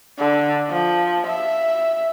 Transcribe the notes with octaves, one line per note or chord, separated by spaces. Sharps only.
D3
F3
E5